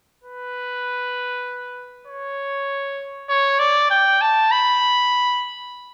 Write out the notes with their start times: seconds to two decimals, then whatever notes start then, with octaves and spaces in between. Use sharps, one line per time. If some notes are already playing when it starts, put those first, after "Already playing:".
0.23 B4
2.07 C#5
3.29 C#5
3.59 D5
3.90 G5
4.21 A5
4.51 B5